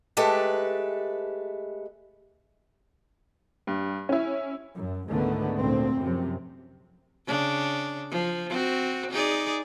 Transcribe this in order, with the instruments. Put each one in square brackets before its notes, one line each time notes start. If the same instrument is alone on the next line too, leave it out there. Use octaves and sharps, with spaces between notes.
[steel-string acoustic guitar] G#3 A3 G4 A4 B4
[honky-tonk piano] G2
C#4 E4
[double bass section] F#2
C#2 G#2 D3 D#3 A3 B3
D2 A#2 C4
F#2 C3 F3
[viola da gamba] C#3 D4
F3
C4 F#4
D#4 G#4 D5